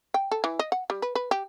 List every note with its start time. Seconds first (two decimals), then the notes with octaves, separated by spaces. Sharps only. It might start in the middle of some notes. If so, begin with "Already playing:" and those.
0.14 G5
0.31 A4
0.44 E3
0.59 D#5
0.72 F#5
0.90 G3
1.02 B4
1.15 B4
1.31 G4